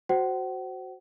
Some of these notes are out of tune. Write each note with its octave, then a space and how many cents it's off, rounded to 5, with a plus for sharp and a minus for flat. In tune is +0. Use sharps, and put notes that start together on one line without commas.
F#4 +0 C5 +0 F#5 +40